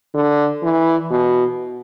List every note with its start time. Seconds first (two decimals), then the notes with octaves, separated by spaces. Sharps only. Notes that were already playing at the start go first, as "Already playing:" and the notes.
0.14 D3
0.63 E3
1.11 B2